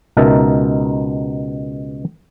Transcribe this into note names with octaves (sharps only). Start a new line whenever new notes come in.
C#2 B2 D#4 A#4 E5 A5